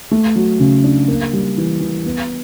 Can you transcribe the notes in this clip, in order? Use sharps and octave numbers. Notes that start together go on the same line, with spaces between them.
A3
F#3
C#3
D4
A#3
G3
E3
E3
B3